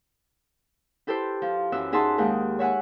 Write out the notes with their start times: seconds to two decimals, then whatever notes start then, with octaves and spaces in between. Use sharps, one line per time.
1.07 E4 G4 A4 B4 C5
1.42 F3
1.72 F#2 E3 E5 E6
1.92 D#4 G#4 E5 F#5 A5 C6
2.18 D#2 G#3 G4 F#5
2.59 C#5 E5 F#5 G#5